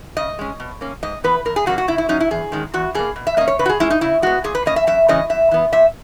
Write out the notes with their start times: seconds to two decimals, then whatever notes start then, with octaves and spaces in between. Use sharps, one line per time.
0.17 C#3 D#5
0.39 G#3 C#4
0.60 B2
0.81 A#3 C#4
1.03 G#2 D#5
1.24 E3 B3 B4
1.45 E2 A#4
1.56 G#4
1.66 C#3 F#3 A#3 F#4
1.78 F#4
1.88 C#3 E4
1.98 E4
2.09 F#3 C#4 D#4
2.20 E4
2.31 E2 G#4
2.52 D#3 G#3 C#4
2.74 E2 F#4
2.95 B2 A#3 G#4
3.16 B2
3.27 E5
3.37 A#3 D#5
3.41 C#4
3.48 C#5
3.59 C#3 B4
3.66 F#4
3.69 G#4
3.80 G#3 C#4 E4
3.90 D#4
4.01 C#3 E4
4.22 G#3 B3 F#4
4.44 A#2 G#4
4.55 B4
4.66 A#3 C#4 D#5
4.76 E5
4.87 F#2 E5
5.08 C#3 E3 G#3 C#4 D#5
5.30 F#2 E5
5.51 E3 B3
5.72 A#2 E5